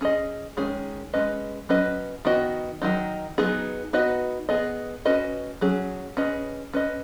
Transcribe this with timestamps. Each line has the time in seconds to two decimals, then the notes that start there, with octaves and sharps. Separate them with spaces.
0.01 C#4 G#4 D#5
0.57 D#3 G#3 C#4 G#4
1.14 G#3 C#4 B4 D#5
1.69 F#3 C#4 B4 D#5
2.25 D#3 B3 F#4 D#5
2.82 D#3 F#3 D#4
3.38 F#3 B3 D#4 G#4
3.93 B3 D#4 F#4 B4 D#5
4.49 B3 G#4 D#5
5.05 C#4 F#4 B4 D#5
5.61 F#3 C#4 G#4
6.17 C#4 G#4 B4 D#5
6.73 C#4 B4 D#5